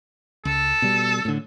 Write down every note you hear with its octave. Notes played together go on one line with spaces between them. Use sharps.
C#2 A4
B2 G3
A2 D3